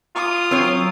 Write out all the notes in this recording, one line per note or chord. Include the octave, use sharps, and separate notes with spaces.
F4 D#6
F#3 C4 C#5